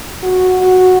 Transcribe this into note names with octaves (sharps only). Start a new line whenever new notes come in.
F#4
F#4